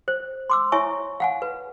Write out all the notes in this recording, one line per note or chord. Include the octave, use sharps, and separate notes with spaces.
C5
C6 D6 E6
E4 C#5 E5 G#5 C#6
F5 F#5 G#5
B4